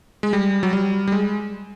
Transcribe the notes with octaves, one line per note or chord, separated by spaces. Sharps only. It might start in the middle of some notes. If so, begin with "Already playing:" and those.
G#3
G3
F#3
G3
G3
G#3